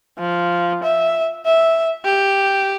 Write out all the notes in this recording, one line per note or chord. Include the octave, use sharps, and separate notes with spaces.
F3
E5
E5
G4